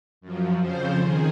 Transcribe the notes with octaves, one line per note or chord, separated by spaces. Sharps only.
F#2 F3
F2 C#3 F3 C5
D#3 G#4